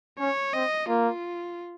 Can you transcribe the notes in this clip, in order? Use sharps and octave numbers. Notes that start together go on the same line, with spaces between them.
C#4 C#5
C4 D#5
A#3 F4